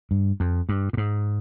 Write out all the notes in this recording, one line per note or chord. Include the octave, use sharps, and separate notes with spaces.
G2
F2
G2
A#2
G#2